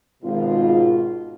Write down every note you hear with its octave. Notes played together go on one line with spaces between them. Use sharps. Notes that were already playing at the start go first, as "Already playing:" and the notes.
G#1 B2 F4